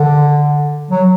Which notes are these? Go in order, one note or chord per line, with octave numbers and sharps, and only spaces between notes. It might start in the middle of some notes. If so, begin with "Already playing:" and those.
Already playing: D3
F#3